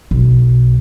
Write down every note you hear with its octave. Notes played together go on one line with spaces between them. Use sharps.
B1